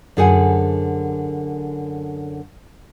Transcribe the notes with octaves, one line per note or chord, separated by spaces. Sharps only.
F#2 D3 G#4 C5 F#5 G#5